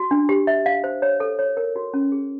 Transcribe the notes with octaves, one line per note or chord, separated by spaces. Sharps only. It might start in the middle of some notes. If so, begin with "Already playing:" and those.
Already playing: F#4
D4
G4
E5
F5
C5
C#5
A4
C#5
A#4
F#4
C#4
G#4